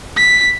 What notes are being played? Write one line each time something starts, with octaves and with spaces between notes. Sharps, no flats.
B6